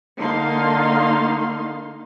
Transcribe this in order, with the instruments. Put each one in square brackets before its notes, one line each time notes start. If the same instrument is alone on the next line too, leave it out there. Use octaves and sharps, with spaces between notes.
[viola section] D3 A#3 D#4 F5 C6